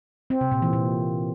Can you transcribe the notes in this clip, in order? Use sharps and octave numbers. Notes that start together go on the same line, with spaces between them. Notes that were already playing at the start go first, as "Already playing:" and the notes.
C4
C3
A#2
E3
A#2